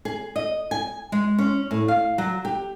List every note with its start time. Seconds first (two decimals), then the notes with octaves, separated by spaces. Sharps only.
0.05 G#4
0.36 D#5
0.71 G#5
1.12 G#3
1.38 C#4
1.71 A2
1.88 F5
2.18 F#3
2.45 G4